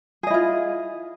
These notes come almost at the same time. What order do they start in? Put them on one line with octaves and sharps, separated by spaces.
G#4 D#5 E4 F4